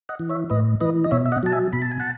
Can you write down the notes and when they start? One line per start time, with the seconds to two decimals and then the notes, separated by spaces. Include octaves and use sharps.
0.09 D#5 F#5
0.19 E3
0.29 C#5 E5
0.50 A2 B4 D#5
0.81 E3 B4 D#5
1.04 D#5
1.11 B2 C#5 E5
1.26 E5
1.32 D#5 F#5
1.43 F#3 A5
1.52 E5 G#5
1.73 B2 B5
1.82 A5
1.91 G#5
2.00 F#5 A5